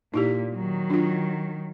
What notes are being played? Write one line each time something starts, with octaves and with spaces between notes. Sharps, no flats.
A#2 D#4 E4 G4
D#3 F#3
D4 F4